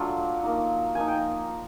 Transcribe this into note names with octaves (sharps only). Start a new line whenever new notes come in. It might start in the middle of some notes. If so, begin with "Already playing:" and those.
Already playing: F#3 A3 D4 F4
A#3 D#4
F3 A#3 D#4 G#5
G5